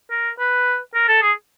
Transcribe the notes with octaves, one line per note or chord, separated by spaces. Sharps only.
A#4
B4
A#4
A4
G#4